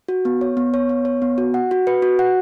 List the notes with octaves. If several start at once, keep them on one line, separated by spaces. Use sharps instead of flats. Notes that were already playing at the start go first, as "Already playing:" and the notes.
F#4
B3
C#5
B3
C#5
B3
C#5
B3
F#4
F#5
F#4
B4
F#4
F#5